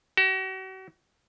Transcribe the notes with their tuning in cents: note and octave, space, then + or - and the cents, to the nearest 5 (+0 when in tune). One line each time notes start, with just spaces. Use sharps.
F#4 +40